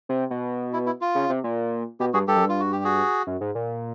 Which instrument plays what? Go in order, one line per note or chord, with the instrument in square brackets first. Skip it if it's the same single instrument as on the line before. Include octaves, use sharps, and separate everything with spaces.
[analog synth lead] C3
B2
[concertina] E4
E4
F4
[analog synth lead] C#3
C3
A#2
[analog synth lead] B2 [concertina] G4
[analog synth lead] G2 [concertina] F#4 G#4
[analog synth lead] G2 [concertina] G4 A4
[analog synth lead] F#2
[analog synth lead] G2 [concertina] F4
[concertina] F#4
G4
F#4 G#4
[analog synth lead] F#2
G#2
A#2